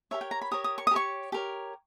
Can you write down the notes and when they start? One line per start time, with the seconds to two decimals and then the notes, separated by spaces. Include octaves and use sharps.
0.11 G4 A#4 C#5 E5
0.21 G5
0.31 A#5
0.42 B5
0.51 G4 A#4 C#5 D#6
0.64 D#6
0.78 C#6
0.87 D#6
0.91 G4 A#4 C#5 C#6
1.32 G4 A#4 C#5